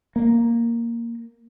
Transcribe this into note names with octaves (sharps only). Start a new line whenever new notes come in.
A#3